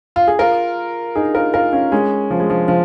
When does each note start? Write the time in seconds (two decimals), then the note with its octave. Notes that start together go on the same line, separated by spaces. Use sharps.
0.16 F4
0.28 G#4
0.39 F4 A#4
1.15 D#4 G#4
1.35 F4 A#4
1.54 F4 A#4
1.73 C#4 F4
1.92 G#3 C#4
2.31 F3
2.40 G#3
2.50 F3
2.68 F3